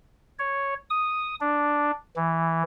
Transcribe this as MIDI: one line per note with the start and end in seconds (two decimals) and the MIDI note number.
0.39 0.74 73
0.90 1.35 87
1.41 1.91 62
2.16 2.63 52